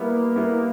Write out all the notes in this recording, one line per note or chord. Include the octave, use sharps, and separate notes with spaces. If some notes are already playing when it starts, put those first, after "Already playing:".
Already playing: G3 A#3 B3 E4
G3 B3 E4